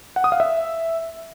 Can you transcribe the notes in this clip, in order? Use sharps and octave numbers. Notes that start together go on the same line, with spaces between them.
F#5
D#6
F5
E5